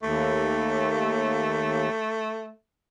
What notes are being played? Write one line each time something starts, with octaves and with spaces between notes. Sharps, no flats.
D#2 A3